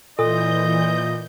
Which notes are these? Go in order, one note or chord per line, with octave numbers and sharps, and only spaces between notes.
A#2 E3 A4 D#5 D#6 G6